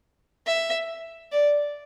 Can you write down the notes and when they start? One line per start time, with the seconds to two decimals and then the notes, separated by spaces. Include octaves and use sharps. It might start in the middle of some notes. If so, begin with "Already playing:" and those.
0.46 E5
1.32 D5